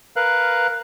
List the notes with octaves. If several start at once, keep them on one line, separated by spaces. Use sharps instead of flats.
A#4 B4 F5 F#6